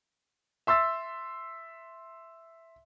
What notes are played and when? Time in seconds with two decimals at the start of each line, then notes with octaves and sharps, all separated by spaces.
0.67 E5 C6 E6 A6